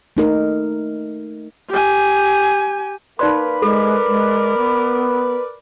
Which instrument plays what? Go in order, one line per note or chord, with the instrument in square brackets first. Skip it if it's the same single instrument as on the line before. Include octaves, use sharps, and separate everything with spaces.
[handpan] A3 D#4 A#4
[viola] G4 G#5
[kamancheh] A#3 [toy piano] D#4 D5 C6 [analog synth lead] B4
[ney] G#3 [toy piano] A4 [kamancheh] A#4 D5
[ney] G#3
B3